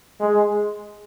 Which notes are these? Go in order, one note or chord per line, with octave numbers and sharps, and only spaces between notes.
G#3